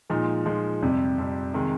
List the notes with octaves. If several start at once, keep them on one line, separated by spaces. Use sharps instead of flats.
A#2 F3 G#3 D#4
A#2 F3 G#3 D#4
F2 C3 G3
F2 C3 G3
C3 D#3 G#3